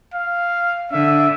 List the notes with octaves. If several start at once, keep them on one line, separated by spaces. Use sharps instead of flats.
F5
D3 E5